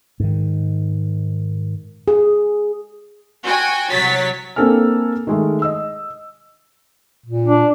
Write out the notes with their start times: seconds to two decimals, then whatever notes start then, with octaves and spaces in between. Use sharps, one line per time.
0.20 G#2 D#3
2.08 G#4
3.44 F#4 G5 G#5
3.89 C2 F#3 C#5 A6 B6
4.56 A#3 C4 D4 A4 G#5 F6
5.27 D#3 G#3 A3
5.62 D#5 E6
7.26 A#2
7.45 D4